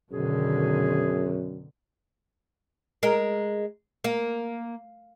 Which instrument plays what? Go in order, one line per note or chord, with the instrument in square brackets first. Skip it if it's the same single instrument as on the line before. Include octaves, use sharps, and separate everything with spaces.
[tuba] F#2 [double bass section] B2 D3 D#3 [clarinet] G#4
[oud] G#3 A#4
A#3